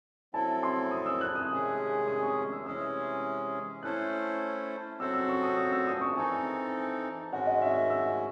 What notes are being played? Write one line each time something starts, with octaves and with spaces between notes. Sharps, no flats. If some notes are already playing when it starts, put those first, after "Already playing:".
F#3 C4 E4 A4 A5
C6
D#6
E6
F#6
D#6
C3 D#3 G#3 C#4 G#4
D#6
C#6
E6
C3 E3 G#3 C#4 G#4 E6
A3 C#4 E4 A4 C5 F#6
F#3 C4 F#4 A4 C5 E6
E6
C#6
D#6
E6
E6
D#6
C#6
E3 C4 D#4 A4 G#5
G#2 D#3 G#3 C#4 F#4 F#5
D#5
E5
E6